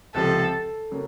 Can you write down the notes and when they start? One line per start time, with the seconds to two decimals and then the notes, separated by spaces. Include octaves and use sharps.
0.14 C#2 C3 F3 A4
0.91 C#3 F#3 A#3